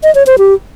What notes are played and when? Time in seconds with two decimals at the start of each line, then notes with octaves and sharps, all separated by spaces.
0.03 D#5
0.15 C#5
0.27 C5
0.38 G4